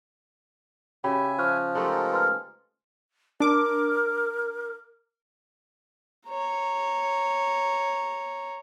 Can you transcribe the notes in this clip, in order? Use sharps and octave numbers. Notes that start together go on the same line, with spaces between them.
C#3 F#4 G4 C#5 E5 G#5 B5
F3 C#6 F6 F#6
G#3 A3 D#4 G4 A4 A#4
B4 C6 F6
D4 A#4 D6
C#5 A#5